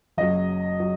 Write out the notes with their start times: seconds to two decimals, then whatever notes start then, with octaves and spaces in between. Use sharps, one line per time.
0.17 F#1 F#2 F#3 D#5
0.80 F#3